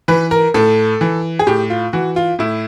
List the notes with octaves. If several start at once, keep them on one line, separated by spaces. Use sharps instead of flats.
E3 B4
A#4
A2 A4
E3
G#4
A2 G4
F4
E3 F#4
F4
A2 E4